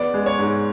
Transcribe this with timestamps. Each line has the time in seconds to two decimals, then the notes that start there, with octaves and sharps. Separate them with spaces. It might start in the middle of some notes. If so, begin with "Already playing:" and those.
Already playing: E2 B3 D5
0.14 G#3
0.26 C#5
0.39 G#2